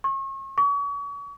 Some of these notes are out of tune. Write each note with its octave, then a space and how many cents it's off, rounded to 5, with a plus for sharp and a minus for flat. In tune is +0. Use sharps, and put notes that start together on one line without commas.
C#6 -35
C#6 +40